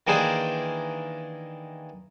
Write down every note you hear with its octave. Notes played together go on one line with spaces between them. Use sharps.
D#3 E3 A#3 D4 G#4 C5